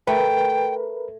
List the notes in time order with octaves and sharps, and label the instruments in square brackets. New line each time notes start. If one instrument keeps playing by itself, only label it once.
[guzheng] A3 [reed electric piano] A#4 B4 [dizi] G5